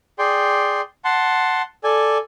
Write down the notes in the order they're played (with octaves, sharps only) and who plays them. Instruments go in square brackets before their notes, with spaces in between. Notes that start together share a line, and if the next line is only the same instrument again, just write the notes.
[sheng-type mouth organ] G#4 D5 G5 C6
F#5 A5 C6
A4 D5 G#5